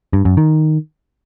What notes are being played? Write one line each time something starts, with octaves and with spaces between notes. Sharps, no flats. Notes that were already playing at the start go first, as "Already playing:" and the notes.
G2
F#2
D#3